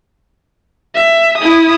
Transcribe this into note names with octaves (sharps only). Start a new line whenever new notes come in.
E5
E4 D#6